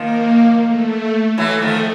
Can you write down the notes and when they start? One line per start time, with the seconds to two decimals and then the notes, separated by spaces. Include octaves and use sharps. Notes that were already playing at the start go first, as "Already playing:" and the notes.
Already playing: D#3 F3 A#3
0.65 A3
1.38 E3 F#3 A3
1.62 D#3 F3